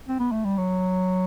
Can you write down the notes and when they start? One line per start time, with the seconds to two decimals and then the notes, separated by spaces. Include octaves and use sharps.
0.08 C4
0.19 B3
0.32 A3
0.45 G3
0.58 F#3